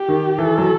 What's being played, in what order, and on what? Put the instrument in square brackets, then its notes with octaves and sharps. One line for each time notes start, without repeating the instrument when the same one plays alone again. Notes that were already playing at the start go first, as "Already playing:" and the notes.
Already playing: [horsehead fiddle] G4
[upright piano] D#3
[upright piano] E3 [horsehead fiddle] A4
[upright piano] F#3